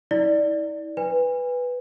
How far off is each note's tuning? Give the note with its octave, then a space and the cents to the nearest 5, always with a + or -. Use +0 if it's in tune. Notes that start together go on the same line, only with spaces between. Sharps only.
E4 -40 D5 +0
B4 +0 G#5 -35